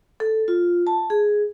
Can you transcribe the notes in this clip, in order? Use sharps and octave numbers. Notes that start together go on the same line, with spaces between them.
A4
F4
A5
G#4